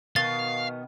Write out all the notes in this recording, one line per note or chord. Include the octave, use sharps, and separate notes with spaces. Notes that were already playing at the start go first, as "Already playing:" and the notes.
B2 D#3 B3 F5 A6 G7